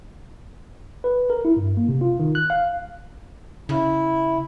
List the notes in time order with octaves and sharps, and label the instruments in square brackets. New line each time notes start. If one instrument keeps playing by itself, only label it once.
[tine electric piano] B4
A#4
E4
G2
A#3
C3
F4
D#3
F#6
F5
[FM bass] C#3 [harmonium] E4